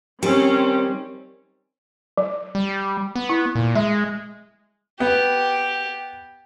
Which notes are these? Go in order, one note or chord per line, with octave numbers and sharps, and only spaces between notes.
D#3 G3 C4 C#4
F#3
G3
B3
E4
A#2
G#3 E5
B3 G4